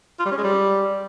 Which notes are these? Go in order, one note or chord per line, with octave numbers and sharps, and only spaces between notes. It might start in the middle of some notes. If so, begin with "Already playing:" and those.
F4
G3
C#4
G#3
G3